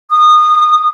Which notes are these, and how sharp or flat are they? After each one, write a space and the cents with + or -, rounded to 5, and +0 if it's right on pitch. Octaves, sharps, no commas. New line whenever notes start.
D#6 -25